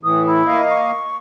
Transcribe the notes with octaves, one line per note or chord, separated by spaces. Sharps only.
A2 E3 D#6
E4
A#3 D#5 F5
C#6